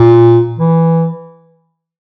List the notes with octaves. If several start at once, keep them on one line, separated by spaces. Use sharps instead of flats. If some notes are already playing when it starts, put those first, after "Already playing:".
Already playing: A#2
E3